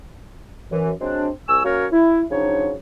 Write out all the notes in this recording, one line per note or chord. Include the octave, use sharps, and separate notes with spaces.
F#2 E3
F#3 G#3 C4 D4
C2 G#5 C#6 E6
F#3 A#3 C#4 F#4 A#4 C#5
E4
C#3 F3 F#3 D4 D#4 C#5